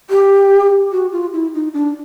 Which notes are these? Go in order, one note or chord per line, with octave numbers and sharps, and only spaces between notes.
G4
F#4
F4
E4
D#4
D4